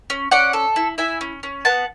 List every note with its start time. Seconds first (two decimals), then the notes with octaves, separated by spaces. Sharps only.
0.10 C#4
0.31 C#4 D5 F#5
0.53 A4
0.76 E4
0.98 E4 E5 G#5
1.21 C#4
1.43 C#4
1.65 B3 F#5 A5